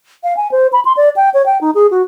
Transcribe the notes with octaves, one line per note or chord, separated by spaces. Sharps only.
F5
G#5
C5
B5
C6
D5
G5
C#5
G5
D#4
G#4
F#4